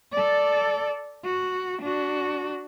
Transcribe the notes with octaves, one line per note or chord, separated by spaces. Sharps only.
A4 D5
F#4
D4 F#4